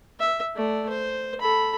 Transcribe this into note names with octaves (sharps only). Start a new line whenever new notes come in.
E5
A3 D5
C5
A4 B5